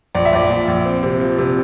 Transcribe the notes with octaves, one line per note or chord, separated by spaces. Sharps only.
A#1 D5
E5
A#1 D5
A#2
A#1
C4
C3
F3
C3